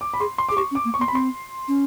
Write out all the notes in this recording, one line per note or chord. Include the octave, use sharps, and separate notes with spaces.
D6
B5
G#4 C6
C6
G#4 D6
G4 C#6
C#4
D6
A#3
C#6
B3
C6
B5
C4 C6
C#4